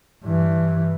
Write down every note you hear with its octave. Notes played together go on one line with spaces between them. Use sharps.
G2 E3